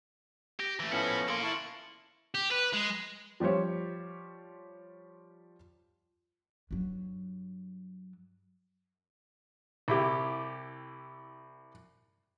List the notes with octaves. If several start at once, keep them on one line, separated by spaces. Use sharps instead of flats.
G4 A#6
E3 A3
F3 B3 C#4 E4 A4 F6 C#7 F#7
A#3 A4 C6 C#7 D7 F#7
E4 A5 C#6 F#7
G4
B4
G#3
F3 G3 G4 C5 C#5
G2 F#3
C2 E4 G4